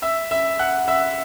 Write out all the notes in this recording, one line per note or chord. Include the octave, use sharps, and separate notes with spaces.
E5 E6
E5 E6
F#5 F#6
E5 E6